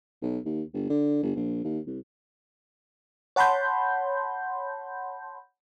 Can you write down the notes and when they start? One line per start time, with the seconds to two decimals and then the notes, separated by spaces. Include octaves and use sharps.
0.22 B1
0.45 D#2
0.73 G1
0.89 D3
1.22 G1
1.36 A#1
1.64 D#2
1.87 C2
3.36 C#5 F#5 A5 B5 C6 G6